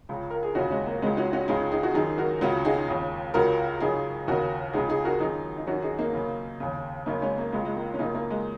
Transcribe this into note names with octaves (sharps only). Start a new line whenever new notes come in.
C#2 C#3
A#4
G#4
D#2 C#3 C#4 F#4
G#3 C#4
A#3
C#2 C#3 G#3 C#4
C#4 F#4
C#4 F#4
C#2 C#3 D#4 G#4
D#4 G#4
F#4
F#2 D#3 D#4 G#4
F#4 A#4
C#2 C#3 C#4 F#4
D#4 G#4
D#2 C#3
C#2 C#3 F#4 A#4
F#2 C#3 D#4 G#4
D#2 C#3 F#4 A#4
C#2 C#3 D#4 G#4
D#4 G#4
F#4 A#4
F#2 D#3 D#4 G#4
D#4
F#2 D#3 C#4 F#4
D#4 G#4
A#3 D#4
F#2 C#3
D#2 C#3
F#2 C#3 A#3 D#4
G#3 C#4
A#3
C#2 C#3 G#3
G#3
A#3
C#4
F#2 C#3 A#3 D#4
A#3
G#3